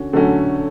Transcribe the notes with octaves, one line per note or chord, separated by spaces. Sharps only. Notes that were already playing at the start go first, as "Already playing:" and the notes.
Already playing: D3 C#4 F#4
D3 F#3 A3 C#4 F#4